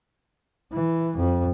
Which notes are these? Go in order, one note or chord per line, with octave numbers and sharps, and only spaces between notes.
E3
F2